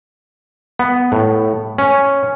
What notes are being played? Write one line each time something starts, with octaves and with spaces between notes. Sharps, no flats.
B3
A2
C#4